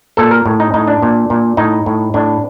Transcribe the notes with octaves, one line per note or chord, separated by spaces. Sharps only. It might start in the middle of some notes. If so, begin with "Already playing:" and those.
A#2 A4
A#4
A2
D#4
A2 D#4
D4
A#2
A#2
A2 D#4
A2
A2 D4